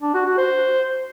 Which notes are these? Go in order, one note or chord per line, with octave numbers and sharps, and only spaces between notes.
D4
F#4
F#4
C5